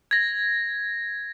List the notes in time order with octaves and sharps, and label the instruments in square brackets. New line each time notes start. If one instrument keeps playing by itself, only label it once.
[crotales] G#6 A#6